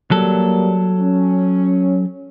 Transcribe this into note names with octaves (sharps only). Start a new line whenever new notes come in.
F#3 G3 A#3 A4
C#4